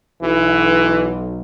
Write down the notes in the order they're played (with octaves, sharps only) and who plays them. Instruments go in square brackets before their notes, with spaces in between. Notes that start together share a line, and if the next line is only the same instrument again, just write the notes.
[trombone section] B1 [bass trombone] E3